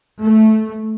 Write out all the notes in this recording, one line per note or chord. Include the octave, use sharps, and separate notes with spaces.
A3